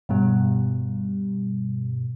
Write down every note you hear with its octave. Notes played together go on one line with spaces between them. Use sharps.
G2 B2 G3